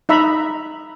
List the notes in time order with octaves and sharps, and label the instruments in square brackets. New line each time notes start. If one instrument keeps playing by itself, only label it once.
[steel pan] D#4 E5 A#5 B5